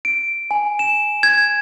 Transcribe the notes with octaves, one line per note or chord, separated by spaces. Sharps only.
D7
G#5
E7
G#6